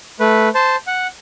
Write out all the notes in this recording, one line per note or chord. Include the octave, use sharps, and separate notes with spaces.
A3 B4
C5 A5
F#5